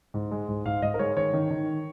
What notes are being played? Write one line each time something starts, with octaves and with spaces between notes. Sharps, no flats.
G#2
G#3
G#2
G#2 F5
G#2 D#5
A#4
G#3 C#5
D#3 C#5
D#3
D#3